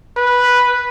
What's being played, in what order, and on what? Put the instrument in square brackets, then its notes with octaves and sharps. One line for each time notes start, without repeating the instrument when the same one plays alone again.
[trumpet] B4